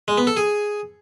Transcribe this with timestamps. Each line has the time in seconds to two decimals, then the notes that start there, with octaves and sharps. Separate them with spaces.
0.08 G#3
0.18 B3
0.27 A4
0.37 G#4